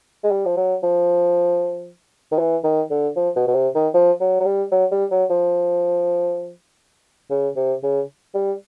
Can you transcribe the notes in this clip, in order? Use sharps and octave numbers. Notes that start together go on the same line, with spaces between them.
G#3
G3
F3
F#3
F3
D#3
E3
D#3
D3
F3
B2
B2
C3
D#3
F3
F#3
F#3
G3
F#3
G3
F#3
F3
C#3
C3
C#3
G3